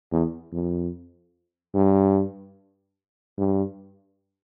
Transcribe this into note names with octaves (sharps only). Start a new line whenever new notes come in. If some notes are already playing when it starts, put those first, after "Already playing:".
E2
F2
G2
G2